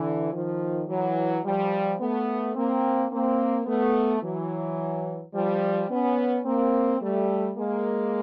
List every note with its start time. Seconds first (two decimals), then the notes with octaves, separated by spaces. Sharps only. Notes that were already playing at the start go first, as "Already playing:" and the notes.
Already playing: D3 E3
0.33 D#3 F3
0.88 E3 F#3
1.44 F3 G3
2.00 A3 B3
2.55 A#3 C4
3.11 A#3 C4
3.67 A3 B3
4.22 E3 F#3
5.34 F3 G3
5.90 B3 C#4
6.45 A#3 C4
7.01 G3 A3
7.56 G#3 A#3